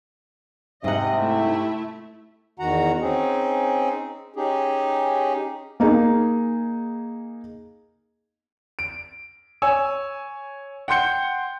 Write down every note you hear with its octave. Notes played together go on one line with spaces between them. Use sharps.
G#2 C3 D#5 F#5
A3 E4 E5
E2 D#3 F#4 F#5 A#5
C4 C#4 D#4 G#4
C#4 D#4 G4 G#4
A#3 D#4 G#4
D7
C#5 G#5 E6
F#5 G5 C6 G6 C#7